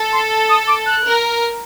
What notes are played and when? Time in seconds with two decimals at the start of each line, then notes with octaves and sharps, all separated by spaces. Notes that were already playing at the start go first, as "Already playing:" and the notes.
Already playing: A4
0.13 C6
0.49 D#6
0.68 D6
0.86 F#6
1.06 A#4